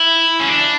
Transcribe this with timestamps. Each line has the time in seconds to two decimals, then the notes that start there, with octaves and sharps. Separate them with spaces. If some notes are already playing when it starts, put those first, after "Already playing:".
Already playing: E4
0.41 C#4
0.49 D4